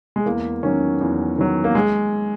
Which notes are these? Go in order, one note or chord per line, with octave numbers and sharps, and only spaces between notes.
G#3
E2 A#3
D#3 F#3 C#4
E2
D#3 F#3
A#3
G#3